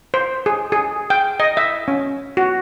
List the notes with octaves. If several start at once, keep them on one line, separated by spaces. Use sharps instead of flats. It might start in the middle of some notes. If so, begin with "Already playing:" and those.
C5
G#4
G#4
G5
D#5
E5
C#4
F#4